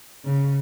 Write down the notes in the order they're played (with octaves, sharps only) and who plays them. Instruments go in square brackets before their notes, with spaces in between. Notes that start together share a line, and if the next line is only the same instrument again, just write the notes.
[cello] C#3